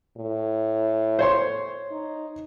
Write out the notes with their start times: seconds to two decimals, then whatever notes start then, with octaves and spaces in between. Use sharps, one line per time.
0.17 A2
1.19 C5 C#5 C6
1.92 D#4